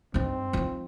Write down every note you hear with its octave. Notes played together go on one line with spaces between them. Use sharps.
G2 C4 D#4
F3 D#4